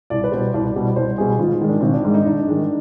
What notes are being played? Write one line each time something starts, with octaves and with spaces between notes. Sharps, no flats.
C2 D5
B4
B2 G3 C5
C2 D5
B2 G3
C2 C5
B2 G3 G#4
G#1 F4
G#2 D#3 G#3
D4
G#1 C4
D4
G#2 D#3 G#3
D#4
G#1 D4
G#2 D#3 G#3